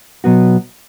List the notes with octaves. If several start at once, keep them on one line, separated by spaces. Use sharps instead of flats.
B2 F#3 B3 F#4